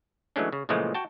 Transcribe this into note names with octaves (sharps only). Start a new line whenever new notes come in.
E3 F#3 G#3 A3 C#4 D4
C#3
A#2 C#3 E3 F3 G#3 A3
F#4 G5 A5